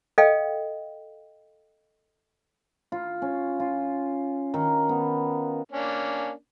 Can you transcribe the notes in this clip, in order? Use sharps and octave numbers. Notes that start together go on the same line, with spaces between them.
A4 D#5 F5 G5
F4
C#4
F4
D#3
B3
A#3 C#4 D4